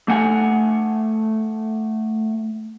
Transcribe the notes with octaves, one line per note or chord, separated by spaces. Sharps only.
A3 F#5 G#5